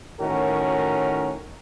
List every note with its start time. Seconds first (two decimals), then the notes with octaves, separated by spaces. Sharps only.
0.19 A2 D#3 C#4 F#4 A#4